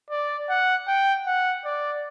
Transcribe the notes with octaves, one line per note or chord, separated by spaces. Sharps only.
D5
F#5
G5
F#5
D5